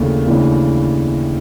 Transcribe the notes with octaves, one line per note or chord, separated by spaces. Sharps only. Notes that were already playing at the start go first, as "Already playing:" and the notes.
Already playing: D#2 C#3 E3 A3 D4
D#2 C#3 E3 A3 D4